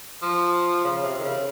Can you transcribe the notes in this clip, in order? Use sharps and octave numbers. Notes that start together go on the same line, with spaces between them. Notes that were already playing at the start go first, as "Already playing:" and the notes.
F3
C#3
C3
D#3
C#3